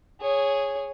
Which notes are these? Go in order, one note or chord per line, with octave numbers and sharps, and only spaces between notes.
G#4 C#5